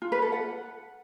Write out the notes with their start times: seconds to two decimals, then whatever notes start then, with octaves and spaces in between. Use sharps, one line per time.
0.02 F4
0.12 B4
0.22 A4
0.32 F#5